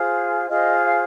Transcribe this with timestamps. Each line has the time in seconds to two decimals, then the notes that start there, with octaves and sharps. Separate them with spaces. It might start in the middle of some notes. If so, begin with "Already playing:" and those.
Already playing: F4 G#4 C5
0.48 F4 G#4 C5 D#5
0.82 F5